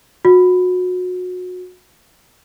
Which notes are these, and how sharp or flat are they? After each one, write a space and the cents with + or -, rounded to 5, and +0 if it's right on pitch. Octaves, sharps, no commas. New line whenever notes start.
F#4 -30